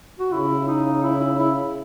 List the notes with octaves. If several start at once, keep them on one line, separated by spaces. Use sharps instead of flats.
F#4
C#3 E4
D#4
E4
E4
E4